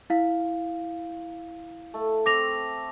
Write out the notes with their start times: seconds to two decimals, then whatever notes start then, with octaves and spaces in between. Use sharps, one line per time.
0.10 E4 F5
1.94 A3
2.26 C4 D6 A#6 F7